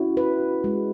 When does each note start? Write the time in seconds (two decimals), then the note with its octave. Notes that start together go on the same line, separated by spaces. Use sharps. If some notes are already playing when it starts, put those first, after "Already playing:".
Already playing: C#4 E4 F#4
0.17 B4
0.64 G#3